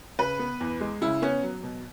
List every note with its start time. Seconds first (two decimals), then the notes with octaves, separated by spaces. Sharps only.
0.19 C#3 B4
0.39 B3
0.60 E2
0.81 G#3
1.02 C#3 E4
1.22 B3 C#4
1.43 F#3
1.63 B2